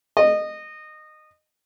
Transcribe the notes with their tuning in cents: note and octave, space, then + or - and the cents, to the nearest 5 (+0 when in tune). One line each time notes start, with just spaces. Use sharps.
D#5 -20